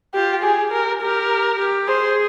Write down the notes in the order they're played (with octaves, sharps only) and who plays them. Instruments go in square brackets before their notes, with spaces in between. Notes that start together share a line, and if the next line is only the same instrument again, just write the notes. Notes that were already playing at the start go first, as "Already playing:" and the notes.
[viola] F4 [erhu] G4
[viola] G4 [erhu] G#4
[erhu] A#4
[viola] G4 [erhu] A#4
[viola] G4
[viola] G#4 [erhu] C5